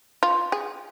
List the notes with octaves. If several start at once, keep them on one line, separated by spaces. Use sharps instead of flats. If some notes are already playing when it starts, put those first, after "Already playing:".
F4
G#4